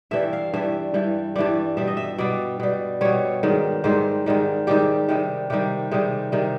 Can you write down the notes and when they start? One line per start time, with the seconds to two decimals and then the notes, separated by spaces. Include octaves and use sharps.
0.11 G2 E3 G3 E5
0.33 F5
0.54 G2 E3 G3 E5
0.94 G2 E3 G3
1.36 G2 E3 G3 D5
1.77 B2 G3 E5
1.88 D#5
1.97 E5
2.18 B2 G3 D5
2.60 B2 G3
3.01 B2 G3 C#5
3.43 G#2 D#3 G3
3.84 G#2 D#3 G3 C5
4.26 G#2 D#3 G3
4.67 G#2 D#3 G3 G4
5.09 C3 D#3 G3
5.50 C3 D#3 G3 G4
5.91 C3 D#3 G3 G#4
6.32 C3 D#3 G3